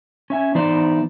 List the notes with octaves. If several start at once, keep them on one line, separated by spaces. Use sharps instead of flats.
C#4 E5 G#5
E3 B3 D#4 C5 D5